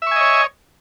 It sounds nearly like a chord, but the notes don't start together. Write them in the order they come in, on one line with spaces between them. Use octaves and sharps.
E5 C#6 G#5 D#5 C#5